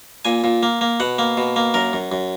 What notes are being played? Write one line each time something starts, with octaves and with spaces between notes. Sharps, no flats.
A#2 G#5
A#2
A#3
A#3
B2 F#5
A#3
B2
A#3
F#2 A#4
F#2
F#2